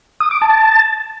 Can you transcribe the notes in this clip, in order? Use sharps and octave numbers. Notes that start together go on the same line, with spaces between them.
D#6
D6
A5